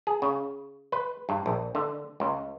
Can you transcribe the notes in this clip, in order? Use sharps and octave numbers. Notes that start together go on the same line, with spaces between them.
G#4
C#3
B4
G2
A#1
D3
C#2